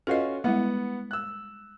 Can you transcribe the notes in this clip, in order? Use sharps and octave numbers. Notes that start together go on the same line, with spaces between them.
C#4 F4 F#4 A4 B4 D#5
G3 G#3 B3 E4 F#5
E6 F#6